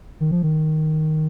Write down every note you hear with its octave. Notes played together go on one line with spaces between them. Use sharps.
D#3
F3
D#3